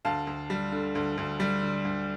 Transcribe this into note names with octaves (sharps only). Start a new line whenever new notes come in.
D2 F5 A5
D2
G3
D3
D2
D2
G3
D3
D2